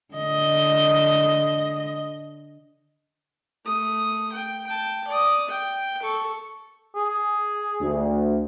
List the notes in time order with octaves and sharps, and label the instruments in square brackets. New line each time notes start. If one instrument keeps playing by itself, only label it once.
[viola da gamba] D3 D#5
[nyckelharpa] A3 D#6
G5
G5 A5
D5 D#6
G5
A4 C#6
[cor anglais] G#4
[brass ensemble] D2